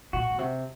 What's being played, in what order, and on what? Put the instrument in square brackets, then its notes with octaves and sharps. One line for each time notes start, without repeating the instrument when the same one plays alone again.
[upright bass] A#2 [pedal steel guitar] F#4
[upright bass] A#2
C3